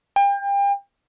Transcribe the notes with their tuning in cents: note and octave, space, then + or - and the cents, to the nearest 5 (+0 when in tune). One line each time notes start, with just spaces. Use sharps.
G5 +35